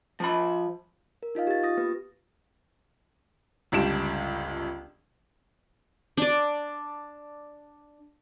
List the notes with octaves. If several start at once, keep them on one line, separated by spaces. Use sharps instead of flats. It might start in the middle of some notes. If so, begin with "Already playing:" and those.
F3 B5
A#4
D#4 F4 D#5 F5
G4 A6
F4 D#6 A#6
A#3 B3 G4 B4 A#6
G1 C#2 D4 G4 D7 E7
D4 D5